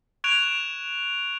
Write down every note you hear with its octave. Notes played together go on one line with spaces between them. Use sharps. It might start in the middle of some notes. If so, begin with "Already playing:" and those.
C#6 F#6 G#6 D7 E7 F7